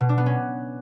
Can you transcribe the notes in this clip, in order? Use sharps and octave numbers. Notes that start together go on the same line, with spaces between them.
B2
D4
B3
C#4